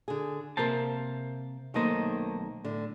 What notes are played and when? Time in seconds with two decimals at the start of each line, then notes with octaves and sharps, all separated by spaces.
0.08 D3 G#4
0.57 C3 A#3 A#4 C5 A5
1.74 B1 D#3 A3 A#3 C5 D#5
2.65 A2 D3